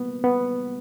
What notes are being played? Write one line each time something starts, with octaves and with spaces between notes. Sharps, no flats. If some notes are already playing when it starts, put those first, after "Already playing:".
Already playing: A#3 B3
B3